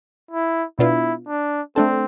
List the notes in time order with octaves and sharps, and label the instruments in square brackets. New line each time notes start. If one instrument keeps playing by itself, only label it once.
[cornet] E4
[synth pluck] B2 B3 D4 F4 [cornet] E4
[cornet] D4
[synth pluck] A3 D4 A4 [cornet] C4